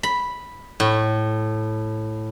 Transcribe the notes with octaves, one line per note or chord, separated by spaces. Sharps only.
B5
A2